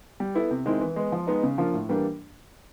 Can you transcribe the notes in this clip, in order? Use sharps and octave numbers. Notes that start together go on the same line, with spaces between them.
G3
B3 E4 A4
C3
D#3 G#3 C4 E4
E3
G#3 B3
F3
G#3 B3 D#4
C#3
F3 A#3 D4 F4
A2
E3 G3 A#3 D4